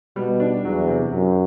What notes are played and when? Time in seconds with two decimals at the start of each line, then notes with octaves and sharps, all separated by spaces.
0.16 B2 G3
0.40 D4
0.65 E2 F#3
0.88 C3
1.12 F#2 F#3